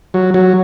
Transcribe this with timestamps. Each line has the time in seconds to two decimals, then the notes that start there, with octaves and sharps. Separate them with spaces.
0.14 F#3
0.34 F#3